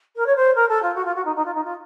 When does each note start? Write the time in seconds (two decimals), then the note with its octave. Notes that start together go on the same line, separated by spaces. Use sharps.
0.16 A#4
0.26 C#5
0.36 C5
0.55 A#4
0.68 A4
0.82 F4
0.95 F#4
1.05 F4
1.15 F#4
1.25 D#4
1.35 D#4
1.45 F4
1.54 D#4
1.64 F4